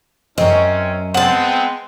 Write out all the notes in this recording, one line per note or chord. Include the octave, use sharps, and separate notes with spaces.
F#2 C4 C#4 D#5
G#3 B3 C4 F#5 A5